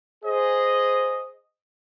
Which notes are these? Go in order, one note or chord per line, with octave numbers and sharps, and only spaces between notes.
G#4 C5 D#5